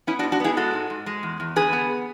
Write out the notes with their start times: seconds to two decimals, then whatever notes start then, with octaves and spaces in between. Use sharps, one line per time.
0.07 B3 C#4 E4
0.19 D4 F#4
0.24 G#2
0.32 D4 F#4
0.40 B3 E4 G#4
0.57 G#3 F#4 A4
0.73 G#2
0.90 G#2
1.06 G#3
1.23 E2
1.40 E2
1.56 D3 G#4 B4
1.73 B3